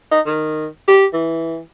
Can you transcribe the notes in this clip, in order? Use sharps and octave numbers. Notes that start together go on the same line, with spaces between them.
D#4
D#3
G4
E3